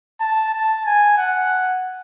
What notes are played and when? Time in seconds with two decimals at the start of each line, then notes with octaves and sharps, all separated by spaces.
0.20 A5
0.53 A5
0.86 G#5
1.18 F#5